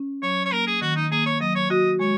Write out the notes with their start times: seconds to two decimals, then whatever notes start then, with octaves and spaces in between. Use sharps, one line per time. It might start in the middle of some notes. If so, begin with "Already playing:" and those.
Already playing: C#4
0.22 F#3 C#5
0.45 C#5
0.52 A#3 A#4
0.67 G#4
0.81 D#3 F#4
0.96 D#4
1.11 A#3 G#4
1.26 C#5
1.41 F#3 D#5
1.55 C#5
1.70 F#4 D#5
1.99 G#3 C#5